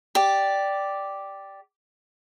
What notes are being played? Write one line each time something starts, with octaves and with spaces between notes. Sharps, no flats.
G4 D5